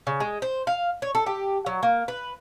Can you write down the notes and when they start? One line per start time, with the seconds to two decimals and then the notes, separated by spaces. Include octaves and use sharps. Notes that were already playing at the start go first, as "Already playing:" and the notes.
0.07 C#3
0.20 G#3
0.42 C5
0.67 F5
1.02 C#5
1.15 A4
1.26 G4
1.66 F#3
1.83 A#3
2.08 B4